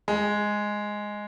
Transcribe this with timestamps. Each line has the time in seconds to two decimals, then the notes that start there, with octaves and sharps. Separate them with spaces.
0.08 G#3